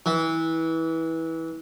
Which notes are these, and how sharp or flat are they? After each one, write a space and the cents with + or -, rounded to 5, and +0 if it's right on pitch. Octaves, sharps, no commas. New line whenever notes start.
E3 -20